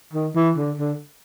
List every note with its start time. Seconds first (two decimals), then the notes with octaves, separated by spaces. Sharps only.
0.13 D#3
0.35 E3
0.56 D3
0.78 D3